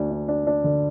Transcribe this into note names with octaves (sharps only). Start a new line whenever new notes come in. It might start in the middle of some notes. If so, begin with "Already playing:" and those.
Already playing: D2 D4
D4
D4
D4
D3